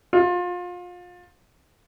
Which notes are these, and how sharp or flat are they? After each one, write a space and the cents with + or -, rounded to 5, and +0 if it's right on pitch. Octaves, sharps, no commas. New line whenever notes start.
F4 +30